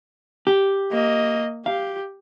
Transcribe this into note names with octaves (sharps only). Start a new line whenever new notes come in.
G4
A#3 D#5
G4 F5